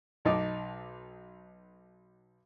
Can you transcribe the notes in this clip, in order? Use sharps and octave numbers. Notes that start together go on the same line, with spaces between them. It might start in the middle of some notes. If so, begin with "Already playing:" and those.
B1 D#4 A5 D6